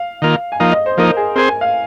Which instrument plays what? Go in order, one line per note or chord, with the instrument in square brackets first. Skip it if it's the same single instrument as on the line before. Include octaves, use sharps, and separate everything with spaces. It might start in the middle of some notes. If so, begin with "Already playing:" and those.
Already playing: [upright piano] F5
[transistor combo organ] D#3 A#3 F4
[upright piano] G#5
[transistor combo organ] F3 A#3 D#4 [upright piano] F5
[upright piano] D#5
C5
[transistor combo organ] F3 A#3 D#4 [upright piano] A#4
[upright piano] G#4
[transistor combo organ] C4 G#4 C5 [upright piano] A#4
[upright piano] G#5
F5